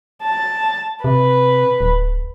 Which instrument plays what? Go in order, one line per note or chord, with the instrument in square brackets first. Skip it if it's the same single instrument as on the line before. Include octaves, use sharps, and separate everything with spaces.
[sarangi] A5
[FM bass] C3 [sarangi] B4
[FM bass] D1